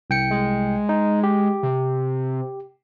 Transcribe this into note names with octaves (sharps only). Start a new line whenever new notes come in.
C2 G5 C#7
G#3
D#4
G4
C3